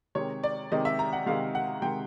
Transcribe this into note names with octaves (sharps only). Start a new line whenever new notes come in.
C3 D#3 G#3 C#5
D5
C3 D#3 G#3 D#5
E5
A#5
F#5
C3 D#3 G#3 F5
F#5
C3 D#3 G#3 G5